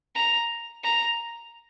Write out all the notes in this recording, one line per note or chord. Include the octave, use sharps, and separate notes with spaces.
A#5
A#5